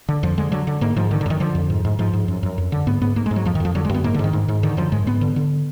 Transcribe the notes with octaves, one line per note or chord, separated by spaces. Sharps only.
D3
F2 F3
D3 G#3
D3 F#3
D3
G#2 A#3
G#2 F3
D3 D#3
D3
F#2 D#3
D3 F3
F2
G#2
G#2
G#2 F3
G#2
F#2
F#2
F2
D3
G#2 B3
G#2 B3
G#2 A#3
G#3
G#2
F#3
F2 F3
D#3
F2 F3
D3 F#3
G#3
F#2 B3
G#2 A#3
D3
G#2 D#3
G#2
G#2
D3 D#3
F#2 F3
G#2 G#3
G#2 B3
D3
D3